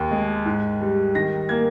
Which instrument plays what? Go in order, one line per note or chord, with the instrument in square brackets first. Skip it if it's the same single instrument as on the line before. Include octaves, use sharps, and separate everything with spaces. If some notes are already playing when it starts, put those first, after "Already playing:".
Already playing: [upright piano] D#2
G#3
G#2
G3
D#3 A#6
A#3 G#6